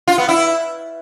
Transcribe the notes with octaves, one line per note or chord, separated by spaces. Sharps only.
F4
B3
E4